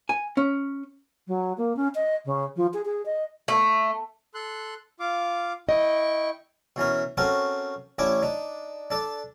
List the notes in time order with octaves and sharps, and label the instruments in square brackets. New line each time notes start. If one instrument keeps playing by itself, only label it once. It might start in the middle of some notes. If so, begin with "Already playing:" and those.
[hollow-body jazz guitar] G#5
C#4
[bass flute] F#3
A#3
C#4
D#5
C#3
F3
G#4
G#4
D#5
[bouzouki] A3
[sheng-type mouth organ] A4 C6 F#6
F4 F5 D6
[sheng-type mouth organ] E4 G5 C#6 [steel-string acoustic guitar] D#5
[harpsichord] B2 E3 C#4 A#4
C4 C#4 F#4 A4 A#4 C5
A1 C#4 D4 E4 C#5 D6
D4 D#4
D4 A4 D5